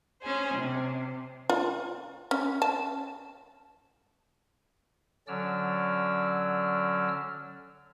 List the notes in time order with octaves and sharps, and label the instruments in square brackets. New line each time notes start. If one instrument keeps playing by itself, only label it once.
[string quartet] C#4 G#4 C5
C3
[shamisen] F4
C#4
A5
[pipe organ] D3 F#3 C#4 D5 E6 F6